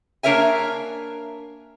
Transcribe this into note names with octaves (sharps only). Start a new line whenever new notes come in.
A#3 D4 A#4 C#5 E5 G#5